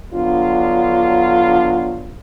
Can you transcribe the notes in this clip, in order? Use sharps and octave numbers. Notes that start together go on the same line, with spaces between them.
D3 F#3 B3 D4 F4